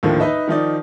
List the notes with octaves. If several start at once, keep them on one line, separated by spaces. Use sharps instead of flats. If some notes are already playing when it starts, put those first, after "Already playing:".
D#2 A2 D3 D#3 F3 A#3
D#4 B4 D#5 E5
D#3 F3 D#4 D5